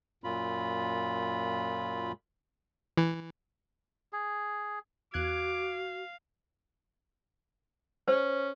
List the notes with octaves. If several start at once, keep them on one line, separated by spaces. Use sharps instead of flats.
F#2 A#2 F4 B5
E3
G#4
E2 F#4 F5 D6 F#6 G#6
C#4 C5